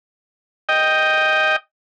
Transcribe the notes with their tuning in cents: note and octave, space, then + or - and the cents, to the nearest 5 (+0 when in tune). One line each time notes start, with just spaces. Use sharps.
D#5 +0 G5 +0